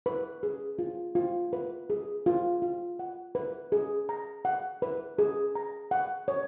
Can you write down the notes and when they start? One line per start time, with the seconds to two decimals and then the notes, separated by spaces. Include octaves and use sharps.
0.06 B4
0.43 G#4
0.79 F4
1.15 F4
1.53 B4
1.90 G#4
2.26 F4
2.62 F4
2.99 F#5
3.35 B4
3.72 G#4
4.09 A#5
4.45 F#5
4.82 B4
5.19 G#4
5.55 A#5
5.91 F#5
6.28 C#5